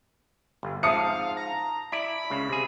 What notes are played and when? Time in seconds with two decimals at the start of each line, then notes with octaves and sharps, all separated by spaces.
0.63 G1
0.83 G#2 F3 F5 A5 D#6 C#7
1.37 A#5
1.92 E4 D5 B5
2.30 C#2 C#3
2.49 C3 G#4